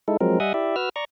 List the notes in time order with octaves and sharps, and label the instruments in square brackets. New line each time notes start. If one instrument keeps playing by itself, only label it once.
[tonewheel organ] G#3 D#4 E4 A4
F3 F#3 G#3 C4 A#4
G3 D#5 E5 F#5 G#5 D#6
E4 G4 D5 E5
F#4 B4 E6 F6
D5 A#5 C#6